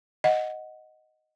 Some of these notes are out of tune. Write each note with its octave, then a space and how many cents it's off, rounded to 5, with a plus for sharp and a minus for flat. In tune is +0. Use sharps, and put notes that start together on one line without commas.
D#5 +0 F#5 +0